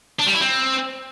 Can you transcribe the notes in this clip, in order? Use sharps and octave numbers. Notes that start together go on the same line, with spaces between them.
D4
G3
E4
C4